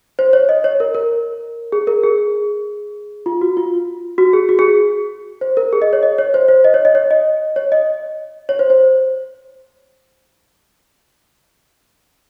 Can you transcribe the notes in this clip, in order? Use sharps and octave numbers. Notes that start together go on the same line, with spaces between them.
C5
C#5
D#5
C#5
A#4
A#4
G#4
A#4
G#4
F4
F#4
F4
F#4
G#4
F#4
G#4
C5
A#4
G#4
D#5
C#5
D#5
C#5
C5
C5
D#5
C#5
D#5
C#5
D#5
C#5
D#5
C#5
C5
C5